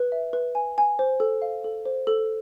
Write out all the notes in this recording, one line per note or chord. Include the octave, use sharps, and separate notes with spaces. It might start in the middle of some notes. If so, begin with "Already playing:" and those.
Already playing: B4
E5
B4
G#5
G#5
C5
A4
F5
A4
C5
A4